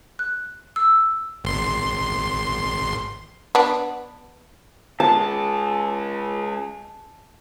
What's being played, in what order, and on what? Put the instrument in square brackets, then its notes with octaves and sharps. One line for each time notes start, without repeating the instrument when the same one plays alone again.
[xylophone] F#6
E6
[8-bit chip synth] G#1 C6
[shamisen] B3 D4
[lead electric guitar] C#3 G#3 [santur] A5